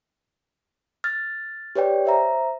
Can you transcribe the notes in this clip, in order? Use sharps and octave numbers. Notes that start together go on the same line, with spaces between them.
F6 A6
G4 B4 C#5 D5 G5
C5 E5 A#5